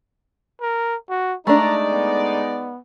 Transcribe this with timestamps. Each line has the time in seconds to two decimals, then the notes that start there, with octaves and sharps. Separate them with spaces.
0.61 A#4
1.10 F#4
1.47 G#3 A3 D4 D#4 D5 A#5
1.91 B3